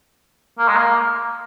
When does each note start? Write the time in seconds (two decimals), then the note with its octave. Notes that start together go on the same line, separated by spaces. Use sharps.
0.59 A#3
0.68 G#3
0.77 A#3